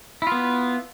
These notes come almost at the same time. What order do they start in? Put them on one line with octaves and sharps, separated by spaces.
E4 F4 B3